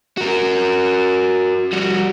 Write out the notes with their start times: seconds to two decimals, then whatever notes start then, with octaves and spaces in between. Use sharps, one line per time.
0.17 F#4 A#4
1.72 G3 F#4